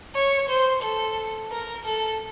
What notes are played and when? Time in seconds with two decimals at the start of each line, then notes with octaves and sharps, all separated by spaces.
0.15 C#5
0.49 C5
0.83 A4
1.51 A#4
1.85 A4